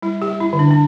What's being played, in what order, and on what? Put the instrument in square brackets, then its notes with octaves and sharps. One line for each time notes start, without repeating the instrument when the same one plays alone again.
[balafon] G3 E4
G4
G3
E4
D3
D4
D4